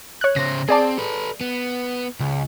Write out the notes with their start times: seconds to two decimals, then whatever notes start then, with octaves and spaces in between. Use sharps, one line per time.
0.21 C#5 F#6
0.36 C#3 C5 A#6
0.69 C4 G#4 D5 A5
0.98 A4 B4
1.41 B3
2.20 C#2